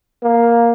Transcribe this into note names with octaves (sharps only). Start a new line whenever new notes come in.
A#3